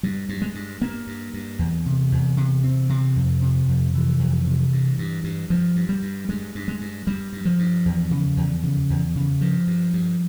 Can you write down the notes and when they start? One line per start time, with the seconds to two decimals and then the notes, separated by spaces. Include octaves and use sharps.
0.03 G2 G3
0.29 G2
0.42 G#3
0.55 G2
0.81 G2 A#3
1.07 G2
1.34 G2
1.59 E2
1.86 C3
2.12 E2
2.37 C3
2.63 E2 C4
2.89 C3 C4
3.16 F2
3.42 C3
3.68 F2
3.93 C3 E3
4.19 F2
4.46 C3
4.73 G2
4.99 G2
5.24 G2
5.50 G2 F3
5.76 G2
5.89 G3
6.02 G2
6.29 G2 G#3
6.55 G2
6.68 G#3
6.81 G2
7.07 G2 G3
7.33 G2
7.45 F3
7.59 G2
7.86 E2
8.11 C#3
8.37 E2
8.63 C#3
8.90 E2
9.15 C#3
9.41 G2 F3
9.67 G2
9.93 G2